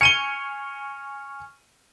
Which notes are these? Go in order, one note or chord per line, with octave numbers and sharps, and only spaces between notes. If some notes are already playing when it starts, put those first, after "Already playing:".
G#5 C#6 F6 C#7 D#7 G7